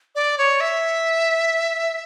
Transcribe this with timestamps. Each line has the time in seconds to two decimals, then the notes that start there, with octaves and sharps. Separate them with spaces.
0.15 D5
0.38 C#5
0.61 E5